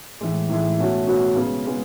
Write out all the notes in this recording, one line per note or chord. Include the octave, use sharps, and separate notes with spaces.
A2 E3 G#3
A2 E3 G#3
B2 A3 C#4 F#4
B2 A3 C#4 F#4
C#3 G#3 B3
C#3 G#3 B3